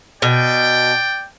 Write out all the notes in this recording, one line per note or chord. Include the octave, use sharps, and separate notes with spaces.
B2 D5 G5